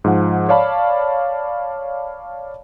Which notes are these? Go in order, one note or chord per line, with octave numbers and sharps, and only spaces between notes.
G#2 F3 F#5
C#5 D5 F5 A5 B5